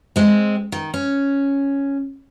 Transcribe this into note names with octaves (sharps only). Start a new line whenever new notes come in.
G#3 C4
D#3
C#4